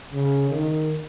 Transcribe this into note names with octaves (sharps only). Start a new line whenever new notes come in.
C#3
D#3